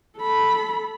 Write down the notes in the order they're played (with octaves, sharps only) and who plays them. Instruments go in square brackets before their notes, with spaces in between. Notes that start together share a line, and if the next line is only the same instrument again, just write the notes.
[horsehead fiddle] A4 B5